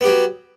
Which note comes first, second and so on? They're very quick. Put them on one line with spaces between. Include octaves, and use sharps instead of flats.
B3 G4 F#3